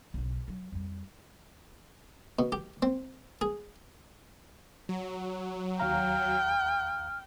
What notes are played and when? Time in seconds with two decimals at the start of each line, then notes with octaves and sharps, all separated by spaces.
0.14 B1 C#3
0.48 F#3
0.72 F2 G3
2.39 B2
2.52 G4
2.82 C4
3.41 G#4
4.89 F#3
5.80 D#2 F5 G5 A#5 F6